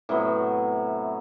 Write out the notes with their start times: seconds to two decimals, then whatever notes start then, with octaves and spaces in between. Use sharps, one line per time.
0.09 A2 C3 F#3 B3